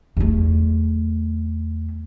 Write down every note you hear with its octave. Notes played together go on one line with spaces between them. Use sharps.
E2 A3